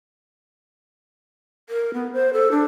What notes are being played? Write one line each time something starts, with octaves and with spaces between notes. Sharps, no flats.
A#4
B3
C5
A4
D4